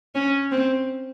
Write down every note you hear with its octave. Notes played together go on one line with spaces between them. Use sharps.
C#4
C4